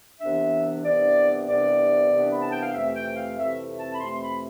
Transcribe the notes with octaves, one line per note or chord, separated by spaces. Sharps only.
C2 C3 E3 B3 D4 E5
C2 C3 E3 B3 D4 D5
C2 C3 E3 B3 D4 D5
C2 C3 E3 B3 D4
B5
A5
G5
F5
F2 C3 E3 A3 C4 E5
G5
F5
F2 C3 E3 A3 C4 E5
A5
B5
F2 C3 E3 A3 C4 C6
B5